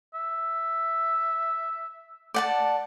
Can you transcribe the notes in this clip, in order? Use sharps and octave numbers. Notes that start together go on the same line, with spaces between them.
E5
D5 F#5 A5